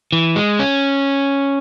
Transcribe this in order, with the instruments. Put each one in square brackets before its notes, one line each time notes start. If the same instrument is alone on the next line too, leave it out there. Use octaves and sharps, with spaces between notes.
[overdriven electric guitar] E3
G#3
C#4